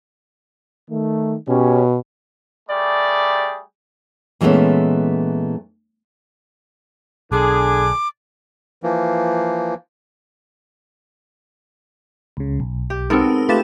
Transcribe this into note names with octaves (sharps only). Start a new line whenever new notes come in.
D#3 A3
B2 C#4 G4
G3 A3 G4 G#4 D5
A#2 E3 G#3 A3 B3 C#4
B1 D3 G#4 D6
E3 F3 A#3
C#2 C#3
B1
G4
G#2 B3 C4 A4 A#4
A3 F4 G4 B4 A6 E7